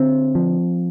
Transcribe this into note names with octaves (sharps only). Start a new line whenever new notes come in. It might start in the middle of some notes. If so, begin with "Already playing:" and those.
Already playing: D3 C4
F3